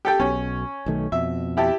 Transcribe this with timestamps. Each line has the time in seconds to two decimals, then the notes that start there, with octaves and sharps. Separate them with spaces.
0.05 G4 A4 G5
0.20 B1 B2 C#4
0.86 B1 D#3 A3
1.12 F2 B2 E5
1.57 E4 G4 A5